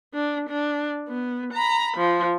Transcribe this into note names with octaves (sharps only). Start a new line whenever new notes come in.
D4
D4
B3
A#5 B5
F3